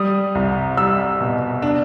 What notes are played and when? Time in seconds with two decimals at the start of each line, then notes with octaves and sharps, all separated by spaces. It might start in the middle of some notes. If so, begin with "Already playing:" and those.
Already playing: G3 D#6
0.35 C2
0.77 G3 E6
1.20 B2
1.62 D4